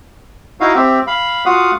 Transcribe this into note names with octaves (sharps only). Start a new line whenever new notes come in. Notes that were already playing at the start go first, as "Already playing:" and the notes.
D#4 E4 F#4 F5
C4 G4 E5
F5 B5
F4 F#4 F5 F#5 D#6